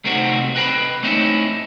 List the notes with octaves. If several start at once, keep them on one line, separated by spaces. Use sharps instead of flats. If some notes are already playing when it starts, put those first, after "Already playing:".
C2 C3 A3 C4 D#4 F#4
B4 D#5 G5 A#5 B5
A3 C4 C#4 D#4 E4